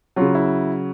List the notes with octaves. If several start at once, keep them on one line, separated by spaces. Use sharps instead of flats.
C#3 F#3 F4
E4